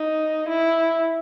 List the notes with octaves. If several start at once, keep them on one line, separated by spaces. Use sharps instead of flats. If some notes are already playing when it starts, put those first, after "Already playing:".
Already playing: D#4
E4